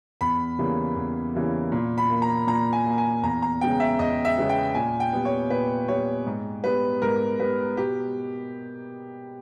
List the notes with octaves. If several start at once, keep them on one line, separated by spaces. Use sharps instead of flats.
E2 B5
C#3 E3 G3 A#3
E2
C#3 E3 G3 A#3
A#2
B5
A#3
A#5
A#2 A#5
G#5
A#3
G#5
E2 A#5
A#5
C#3 G#3 B3 G5
E5
E2 D#5
E5
C#3 G#3 B3
G5
A#2 G#5
G5
G3 B3
C#5
A#2 B4
G3 B3 C#5
G#2
G3 B3 B4
G#2 A#4
G3 B3 B4
B2 G4